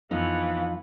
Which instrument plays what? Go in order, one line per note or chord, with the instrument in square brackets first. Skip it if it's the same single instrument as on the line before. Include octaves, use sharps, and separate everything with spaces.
[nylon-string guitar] F2 F3 D#4 [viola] E3 B3 [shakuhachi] F5